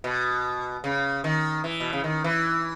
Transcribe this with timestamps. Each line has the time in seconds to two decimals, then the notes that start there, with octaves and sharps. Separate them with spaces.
0.04 B2
0.84 C#3
1.24 D#3
1.64 E3
1.80 B2
1.93 C#3
2.04 D#3
2.24 E3